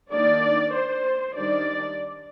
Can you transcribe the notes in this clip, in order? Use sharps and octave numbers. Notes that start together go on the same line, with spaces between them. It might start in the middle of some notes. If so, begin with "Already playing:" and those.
D#3 A#3 D4 D5
C5
D#3 G3 D4 D5